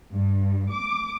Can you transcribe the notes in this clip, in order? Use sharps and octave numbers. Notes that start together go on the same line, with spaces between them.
G2
D6